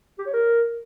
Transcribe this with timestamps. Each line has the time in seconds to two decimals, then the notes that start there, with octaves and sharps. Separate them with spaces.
0.19 G4
0.26 C#5
0.33 A#4